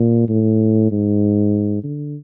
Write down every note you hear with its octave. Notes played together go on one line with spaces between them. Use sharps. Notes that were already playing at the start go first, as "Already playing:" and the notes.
Already playing: A#2
A2
G#2
D3